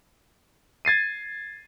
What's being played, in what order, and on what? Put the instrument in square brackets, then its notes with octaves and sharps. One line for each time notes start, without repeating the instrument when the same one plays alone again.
[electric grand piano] G#6 A6 C7 D#7